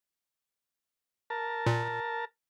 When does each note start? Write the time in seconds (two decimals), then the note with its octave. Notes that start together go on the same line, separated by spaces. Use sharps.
1.30 A#4 A5
1.66 A#2